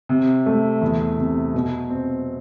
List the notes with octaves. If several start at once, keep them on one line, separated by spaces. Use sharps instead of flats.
C3
A3
E2
C3
B2
C4